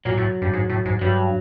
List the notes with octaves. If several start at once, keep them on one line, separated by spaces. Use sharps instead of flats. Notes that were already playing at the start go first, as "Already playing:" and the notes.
A#2 F#3
A2
G2
G#2
A2
G#2
G2 F#3